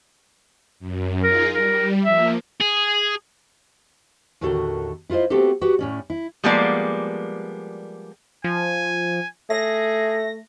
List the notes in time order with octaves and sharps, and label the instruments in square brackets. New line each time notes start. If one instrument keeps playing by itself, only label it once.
[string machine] F#2
[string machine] D#4 F4 G#4 [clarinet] A#4
[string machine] G3 [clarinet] A#4
[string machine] F3 A#3 [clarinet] E5
[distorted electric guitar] G#4
[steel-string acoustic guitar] D#2 A2 D3 F#4 A4 A#4
E4 F4 A4 C5 D#5
A3 B3 C4 F#4 G4 A4
F#4 G4 B4 F#5
A2 C#4 D5
E4
[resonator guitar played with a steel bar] F3 G3 G#3 A#3 B3 D5
[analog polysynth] F3 [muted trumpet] G#5
[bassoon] A3 [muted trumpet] G#4 [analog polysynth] A#6